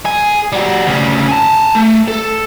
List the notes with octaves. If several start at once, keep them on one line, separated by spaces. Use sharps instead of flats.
G#4
G3 F#4
D2 C#3
G#5 A5
A3
A4